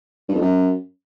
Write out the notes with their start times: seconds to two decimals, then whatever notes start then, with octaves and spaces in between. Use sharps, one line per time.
0.28 G2
0.35 F2
0.41 F#2